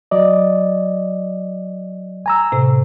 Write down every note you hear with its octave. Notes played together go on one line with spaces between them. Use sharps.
F#3 D5 D#5
G#5 A#5 E6
A2 C3